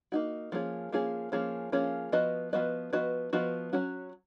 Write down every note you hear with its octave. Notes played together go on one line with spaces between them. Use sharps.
A#3 D#4 F#4
F3 A#3 C#4 F4 G#4
F3 A#3 C#4 F4 G#4
F3 A#3 C#4 F4 G#4
F3 A#3 C#4 F4 G#4
F3 B3 F#4 B4 D#5
F3 B3 F#4 B4 D#5
F3 B3 F#4 B4 D#5
F3 B3 F#4 B4 D#5
F#3 C#4 F#4